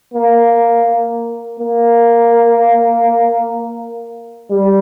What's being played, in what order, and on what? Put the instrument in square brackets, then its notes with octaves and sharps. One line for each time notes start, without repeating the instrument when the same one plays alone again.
[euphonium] A#3
A#3
G3